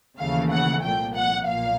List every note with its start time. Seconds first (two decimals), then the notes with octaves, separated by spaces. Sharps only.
0.18 D#2 C#3 E3 A3 F5
0.51 F#5
0.83 C2 A#2 F3 G5
1.15 F#5
1.46 B1 A#2 F5